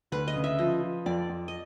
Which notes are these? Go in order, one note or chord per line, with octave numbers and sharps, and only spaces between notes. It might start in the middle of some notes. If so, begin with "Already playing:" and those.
D2 B4
D#5
C#3
E5
F3 D#5
F3
F2 D5
F2
D#5